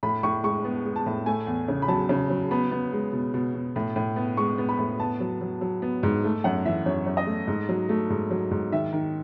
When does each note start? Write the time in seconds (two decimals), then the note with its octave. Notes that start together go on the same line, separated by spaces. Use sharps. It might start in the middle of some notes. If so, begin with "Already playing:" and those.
0.03 A2 B5
0.23 A2 C#6
0.43 G#3 C#6
0.65 B3
0.85 G#3
0.96 A5
1.06 A2
1.26 A3 G#5
1.47 E2
1.68 C#3
1.82 B5
1.88 F#3 A5
2.09 C#3
2.30 F#3
2.51 B3 B5
2.71 B3
2.93 G#3
3.13 B2
3.34 B2
3.54 B2
3.76 A2
3.96 A2
4.16 B3
4.37 G#3 C#6
4.58 B3
4.69 B5
4.79 A2
4.99 B3 A5
5.20 F#3
5.41 F#3
5.61 F#3
5.82 B3
6.03 G#2
6.24 A3
6.44 F#2 F#5
6.65 E3 E5
6.86 F#2 C#5
7.06 F#2
7.17 D#5
7.27 A3
7.47 G#2
7.69 F#3
7.89 A3
8.10 G#2
8.31 F#3
8.51 G#2
8.72 D#3 E5
8.93 D#3